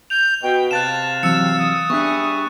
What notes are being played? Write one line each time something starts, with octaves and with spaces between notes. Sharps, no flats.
G6 F7
B2 G5
C3 F5 A5 F#6 A6 E7
E3 F#3 C4 E6 C#7 E7
D#6
G3 B3 D4 G#4 E5 C#6 F#6